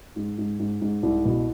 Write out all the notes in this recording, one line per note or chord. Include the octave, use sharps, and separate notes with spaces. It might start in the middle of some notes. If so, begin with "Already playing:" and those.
G#2
G#2
G#2
G#2
C2
B2